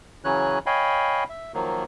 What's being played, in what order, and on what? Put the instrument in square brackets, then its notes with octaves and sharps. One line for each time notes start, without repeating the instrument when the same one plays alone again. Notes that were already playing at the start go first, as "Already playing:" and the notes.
[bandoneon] C#3 E3 F#3 C#4 C#5 F#6
C#5 D#5 F5 G5 G#5 B5
E5
D#3 F3 F#3 A#3